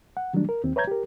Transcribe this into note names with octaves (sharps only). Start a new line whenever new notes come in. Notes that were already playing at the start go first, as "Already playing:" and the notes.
F#5
D#3 F#3 G3 A3 D4
A#4
D#2 C4
B4 C#5 E5 A#5 G6 G#6
G4 A#4